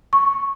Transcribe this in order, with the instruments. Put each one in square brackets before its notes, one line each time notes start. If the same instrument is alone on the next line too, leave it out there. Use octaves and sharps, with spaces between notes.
[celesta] C#6